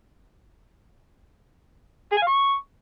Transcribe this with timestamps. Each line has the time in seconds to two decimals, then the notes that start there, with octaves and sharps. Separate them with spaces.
2.12 G#4
2.17 G#5
2.22 F5
2.27 C#6